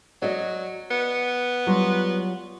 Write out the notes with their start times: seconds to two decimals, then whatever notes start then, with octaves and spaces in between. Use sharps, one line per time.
0.22 F#3 D5 D#5
0.91 B3
1.67 F#3 G3 F4